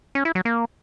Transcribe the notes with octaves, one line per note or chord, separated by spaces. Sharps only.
C#4
E4
F#3
A#3